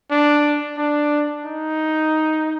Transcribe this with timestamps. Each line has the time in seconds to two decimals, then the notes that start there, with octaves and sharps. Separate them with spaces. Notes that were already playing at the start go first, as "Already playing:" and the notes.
0.11 D4
0.78 D4
1.45 D#4